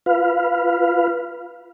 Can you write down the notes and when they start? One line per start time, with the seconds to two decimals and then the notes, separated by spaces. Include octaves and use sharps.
0.06 F4 B4 F5